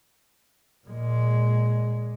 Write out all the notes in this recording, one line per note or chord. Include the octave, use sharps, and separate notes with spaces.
A#2 G#3